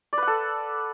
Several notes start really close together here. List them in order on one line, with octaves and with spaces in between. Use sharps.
D5 B4 F#5 A4